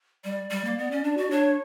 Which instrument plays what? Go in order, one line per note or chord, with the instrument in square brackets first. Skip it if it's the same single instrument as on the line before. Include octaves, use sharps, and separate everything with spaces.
[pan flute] G3 [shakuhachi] D5
[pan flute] G3
A#3
B3
C#4
D4
F#4
[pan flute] D4 [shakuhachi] C#5